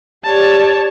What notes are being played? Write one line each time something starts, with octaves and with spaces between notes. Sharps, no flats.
G4 C#5 D5 A5